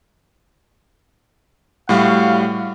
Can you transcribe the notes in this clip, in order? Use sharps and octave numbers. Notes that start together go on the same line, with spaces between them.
A2 G3 F#4 F5